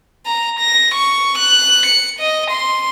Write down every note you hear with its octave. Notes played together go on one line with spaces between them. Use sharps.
A#5
A#6
C#6
F#6
C#7
D#5
C6